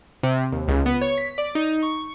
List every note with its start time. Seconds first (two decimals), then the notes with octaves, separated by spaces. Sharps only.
0.23 C3
0.52 D#2
0.68 C#2
0.86 B3
1.01 C#5
1.18 B6
1.38 D5
1.55 D#4
1.82 C#6